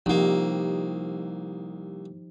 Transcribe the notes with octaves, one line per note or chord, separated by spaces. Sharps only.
C2 F3 A#3 D#4 G4